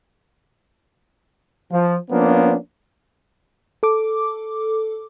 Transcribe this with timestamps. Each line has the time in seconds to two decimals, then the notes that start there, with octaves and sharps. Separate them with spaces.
1.72 F3
2.11 F3 A#3 B3 C#4 D4
3.83 A4 D6